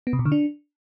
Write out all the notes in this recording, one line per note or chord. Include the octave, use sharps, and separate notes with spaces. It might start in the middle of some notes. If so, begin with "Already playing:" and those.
B3
C3
B2
D3
D4